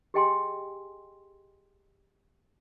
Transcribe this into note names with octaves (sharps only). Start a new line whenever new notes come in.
G4 G#4 D#5 G5 G#5 C6